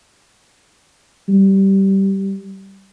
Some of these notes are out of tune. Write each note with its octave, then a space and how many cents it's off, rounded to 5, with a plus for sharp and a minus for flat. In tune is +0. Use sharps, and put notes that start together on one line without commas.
G3 -15